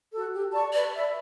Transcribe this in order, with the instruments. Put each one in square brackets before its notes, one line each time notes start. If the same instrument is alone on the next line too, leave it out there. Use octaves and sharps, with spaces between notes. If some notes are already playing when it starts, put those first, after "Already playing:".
[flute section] F#4 A4
G4
D5 A5 C#6
[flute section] B4 [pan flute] D5
[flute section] E5 B5